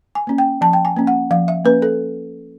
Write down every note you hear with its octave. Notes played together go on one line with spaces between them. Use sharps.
G#5
A#3 C#4
G5
F3 A5
G5
G#5
A#3 C#4
F#5
F3 F5
E5
A#3 C#4 B4
A4